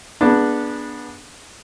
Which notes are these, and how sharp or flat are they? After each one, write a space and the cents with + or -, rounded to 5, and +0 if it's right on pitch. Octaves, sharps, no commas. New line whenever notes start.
B3 -20 D4 +5 G#4 +0